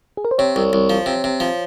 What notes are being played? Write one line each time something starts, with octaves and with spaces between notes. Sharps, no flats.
G#4
A#4
C5
C3 C#5
C2
C2
F3
C3
C3
F3